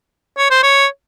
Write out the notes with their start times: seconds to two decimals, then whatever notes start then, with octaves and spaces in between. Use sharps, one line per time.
0.38 C#5
0.50 C5
0.63 C#5